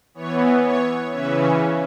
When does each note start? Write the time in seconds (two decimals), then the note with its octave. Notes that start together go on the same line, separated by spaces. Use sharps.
0.14 E3 B3 C#5
0.63 C#5
1.11 C#3 E3 C#4 B4 E5